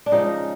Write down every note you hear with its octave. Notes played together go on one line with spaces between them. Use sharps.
D4
C#3 F3 G#3 D#4